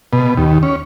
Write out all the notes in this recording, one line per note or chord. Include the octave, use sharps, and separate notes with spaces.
B2
D#2
C#4